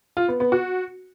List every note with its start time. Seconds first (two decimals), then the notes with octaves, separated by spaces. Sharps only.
0.17 F4
0.28 B3
0.40 B3
0.52 F#4